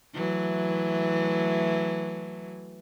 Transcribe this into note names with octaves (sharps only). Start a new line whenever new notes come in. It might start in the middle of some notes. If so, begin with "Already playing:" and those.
E3 F#3 A3